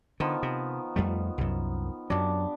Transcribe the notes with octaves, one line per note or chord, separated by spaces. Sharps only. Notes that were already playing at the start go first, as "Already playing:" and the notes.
D3 D#3 F3 B3
C3
F2 G3 A3
C2 F#2
F#2 F#3 D4 G4